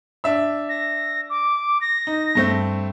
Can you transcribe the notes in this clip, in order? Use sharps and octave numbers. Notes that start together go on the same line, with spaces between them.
D4 E5 E6
A#6
D6
A#6
D#4
G2 A3 C4